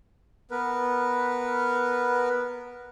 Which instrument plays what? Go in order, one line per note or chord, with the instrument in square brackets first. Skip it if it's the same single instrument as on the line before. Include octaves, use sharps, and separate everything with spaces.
[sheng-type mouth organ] B3 A#4 B4